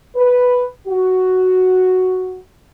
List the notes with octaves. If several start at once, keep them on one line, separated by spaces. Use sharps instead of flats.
B4
F#4